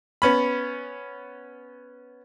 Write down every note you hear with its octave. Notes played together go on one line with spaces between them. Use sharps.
B3 C#4 B5